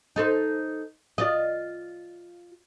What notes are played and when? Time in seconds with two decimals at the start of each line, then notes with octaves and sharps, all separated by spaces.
0.16 D#4 A4 C5
1.18 F4 D5 D#5